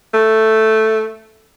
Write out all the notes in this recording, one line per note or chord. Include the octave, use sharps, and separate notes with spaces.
A3